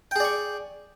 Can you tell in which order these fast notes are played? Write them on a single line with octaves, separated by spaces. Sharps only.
G5 G#4 D5 C#6